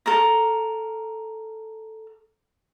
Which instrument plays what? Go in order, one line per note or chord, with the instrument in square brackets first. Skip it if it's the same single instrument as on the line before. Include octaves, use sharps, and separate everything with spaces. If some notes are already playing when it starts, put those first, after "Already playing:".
[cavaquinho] A4 A#4 A#5